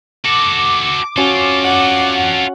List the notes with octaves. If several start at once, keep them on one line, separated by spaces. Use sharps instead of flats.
F#4 A4 D6
C#4 F4 F#4 A4
F#5